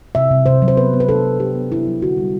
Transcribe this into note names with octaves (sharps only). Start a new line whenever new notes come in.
C3 E5
C3
C3 C5
F#3
C5
B3 B4
B3
B4
D4 A4
D4
D4 G4
B3
D4 E4
F#3
D3 F#4
G3